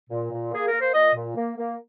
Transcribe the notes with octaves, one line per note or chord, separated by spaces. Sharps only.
A#2
A#2
A#3 G#4
A#3 A#4
C5
A#2 D#5
A#2
A#3
A#3